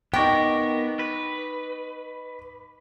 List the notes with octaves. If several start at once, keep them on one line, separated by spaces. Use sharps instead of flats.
B3 D#4 A#4 G5 C#6 D6
B4